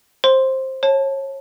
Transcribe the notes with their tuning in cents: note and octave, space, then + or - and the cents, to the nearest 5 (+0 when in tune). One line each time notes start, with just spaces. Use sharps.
C5 +15 C6 +0
C#5 -30 A5 -5